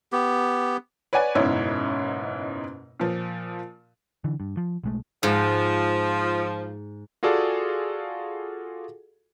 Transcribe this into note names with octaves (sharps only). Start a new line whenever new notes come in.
B3 G4
B4 C#5 D5 F#5 G#5
F#1 G#2 B2 E4 C#5
A#2 F3
D3 E3
G2
F3
B1 G#3 A3
G#2 F3
F4 F#4 G#4 A4 D5 F5